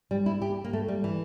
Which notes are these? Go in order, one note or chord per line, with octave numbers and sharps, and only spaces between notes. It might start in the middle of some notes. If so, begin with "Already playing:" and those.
G3
E4
G4
A#3
A3
G3
E3